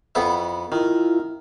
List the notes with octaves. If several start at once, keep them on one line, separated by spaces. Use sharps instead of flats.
F2 B3 E4
D#3 E4 F4